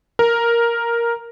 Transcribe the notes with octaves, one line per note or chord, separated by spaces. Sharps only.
A#4